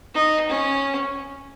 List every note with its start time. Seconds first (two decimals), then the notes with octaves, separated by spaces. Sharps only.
0.15 D#4
0.49 C#4